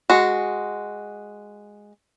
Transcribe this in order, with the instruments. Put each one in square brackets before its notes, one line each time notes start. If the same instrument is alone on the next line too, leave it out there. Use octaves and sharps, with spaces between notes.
[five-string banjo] G#3 F#4